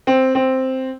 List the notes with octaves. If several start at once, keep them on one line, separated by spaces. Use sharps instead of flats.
C4
C4